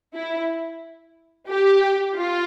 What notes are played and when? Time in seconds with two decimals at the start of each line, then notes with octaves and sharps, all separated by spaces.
0.14 E4
1.48 G4
2.16 F4